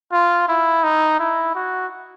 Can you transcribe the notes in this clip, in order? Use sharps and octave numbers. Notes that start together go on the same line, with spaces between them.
F4
E4
D#4
E4
F#4